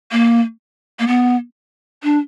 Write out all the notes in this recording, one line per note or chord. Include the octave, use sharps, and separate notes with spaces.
A#3
A#3
B3
D4